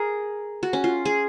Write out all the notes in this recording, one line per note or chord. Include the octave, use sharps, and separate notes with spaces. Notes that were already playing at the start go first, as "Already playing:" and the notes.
Already playing: G#4 A#4
F#4
C#4
F4
G#4